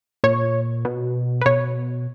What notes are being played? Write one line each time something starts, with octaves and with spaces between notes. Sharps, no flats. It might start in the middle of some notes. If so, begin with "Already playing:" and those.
A#2 C#5
B2
B4
B2 C#5